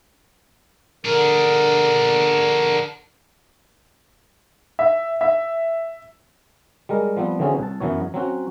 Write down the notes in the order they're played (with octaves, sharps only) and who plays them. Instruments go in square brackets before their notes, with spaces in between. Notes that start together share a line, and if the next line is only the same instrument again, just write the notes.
[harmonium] D3 A#4 [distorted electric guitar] D4 G#4
[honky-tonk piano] E5
E5
[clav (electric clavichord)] G3 G#3 A#4
F3 G3 B3 C4
D3 E3 F#3 C4 C#4 G#4
C2 A5
F#2 E3 F#3 B3 C#5
F#3 C4 C#4 F#4